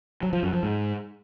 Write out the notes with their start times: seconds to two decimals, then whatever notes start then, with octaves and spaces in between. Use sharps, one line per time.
0.23 F#3
0.33 F3
0.43 F#2
0.53 F3
0.63 G#2